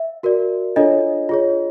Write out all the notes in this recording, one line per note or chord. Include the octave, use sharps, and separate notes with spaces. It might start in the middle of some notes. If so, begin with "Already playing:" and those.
Already playing: E5
F#4 A#4 D5
D4 F4 A4 C#5 D#5
F4 G#4 C#5